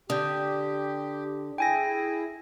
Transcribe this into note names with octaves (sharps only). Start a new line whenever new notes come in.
D3 G4 D#6 G6
E4 G#4 G5 G#5 A#6